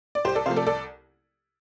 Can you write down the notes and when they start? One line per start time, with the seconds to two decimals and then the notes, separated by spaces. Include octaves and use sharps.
0.15 D5
0.25 C2 G4 C5
0.35 A4 D5
0.46 C3 F3 A3 C5 F5
0.56 A4 D5
0.66 C2 A4 D5